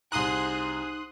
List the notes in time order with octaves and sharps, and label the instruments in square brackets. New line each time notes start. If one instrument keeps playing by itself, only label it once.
[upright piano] C2 A#5 [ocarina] D#4 [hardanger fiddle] G#4 C5 [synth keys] C6 D#6 F#6